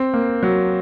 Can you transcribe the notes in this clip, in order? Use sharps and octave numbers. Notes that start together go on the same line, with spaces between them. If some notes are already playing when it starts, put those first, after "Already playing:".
Already playing: C4
A#3
F#3